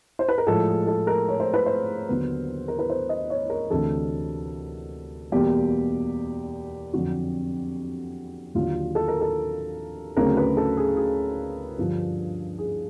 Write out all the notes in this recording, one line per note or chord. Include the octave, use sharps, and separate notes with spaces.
C5
B4
A#4
A2 F3 G#3 A4
G#4
A4
A#4
C#5
C5
B4
C5
D#2 D3 F#3 B3
A#4
B4
C5
D#5
C#5
A#4
D2 C3 E3 A4
E2 B2 G3 A#3 G4
F2 D3 F#3 F#4
D#2 D3 F#3 F4
A4
A#4
A4
D2 C#3 F#3 A3 C4 A#4
B4
A4
G#4
G#4
G2 D3 F3
G#4